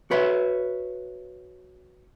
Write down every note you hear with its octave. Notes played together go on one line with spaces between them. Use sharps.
F#4 B4 C#5 E5